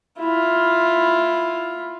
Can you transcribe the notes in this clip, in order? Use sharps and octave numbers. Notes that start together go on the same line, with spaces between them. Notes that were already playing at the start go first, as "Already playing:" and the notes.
E4 F4